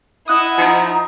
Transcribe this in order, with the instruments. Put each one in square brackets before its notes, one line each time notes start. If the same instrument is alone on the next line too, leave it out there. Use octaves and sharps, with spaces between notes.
[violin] E4 [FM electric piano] D#5 F#5 D#6
[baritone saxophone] F3 [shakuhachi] D#4